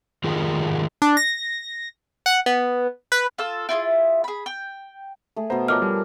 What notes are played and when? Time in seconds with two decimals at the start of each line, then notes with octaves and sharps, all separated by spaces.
0.24 D#3 F4 G4 G#4 A#4
1.02 D4
1.17 A#6
2.26 F#5
2.46 B3
3.12 B4
3.38 F4 A4 E6
3.69 E4 F4 G4 G#4
4.24 G#4 B5
4.46 G5
5.36 A3 G#4
5.50 B2 B3 C5 A#5
5.68 F3 A#4 C#5 D#5 F#5 A#5 D6 F6
5.82 G3